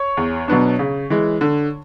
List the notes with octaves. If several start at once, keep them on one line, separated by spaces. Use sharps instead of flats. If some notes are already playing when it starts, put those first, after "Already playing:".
Already playing: C#5 C#6
E2
B2 F#3 B3 D4
C#3
E3 G#3
D3